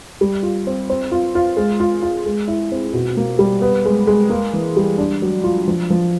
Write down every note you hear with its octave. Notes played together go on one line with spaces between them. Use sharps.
G3
F4
C4
C4
F4
F4
G#3
F4
F4
G#3
E4
C4
B2
A#3
G3
B3
G#3
G#3
A#3
E3
G3
D4
F#3
F4
F3
F3